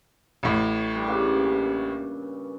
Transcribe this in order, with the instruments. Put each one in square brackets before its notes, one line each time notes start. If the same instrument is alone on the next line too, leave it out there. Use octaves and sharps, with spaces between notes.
[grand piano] A1 A2
[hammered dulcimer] G2 G3 D4
G2 A#2 C#3
C#4